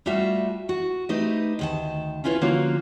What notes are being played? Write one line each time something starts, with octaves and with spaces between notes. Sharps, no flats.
G3 A3 F4 F#4 E5
F#4
A3 D#4 G4 B4 C5 D#5
D2 D#3 A5
C#4 E4 F4 B4 C#5
D3 F3 A#3 C#4 F4 F#4